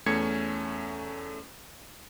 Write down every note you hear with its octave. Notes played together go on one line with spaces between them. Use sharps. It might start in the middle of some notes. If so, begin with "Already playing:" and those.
E2 A3 C#4 G#6 C#7